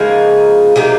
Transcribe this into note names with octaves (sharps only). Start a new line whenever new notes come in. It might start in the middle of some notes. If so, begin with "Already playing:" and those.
Already playing: C#3 F3 G#3 A#3 D#4 G#4
C3 F#3 A#3 D#4